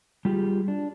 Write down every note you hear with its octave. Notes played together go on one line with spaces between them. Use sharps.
G3 F4 G4 G#4
D4